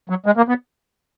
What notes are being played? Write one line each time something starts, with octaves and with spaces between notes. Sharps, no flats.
F#3
G#3
A#3
B3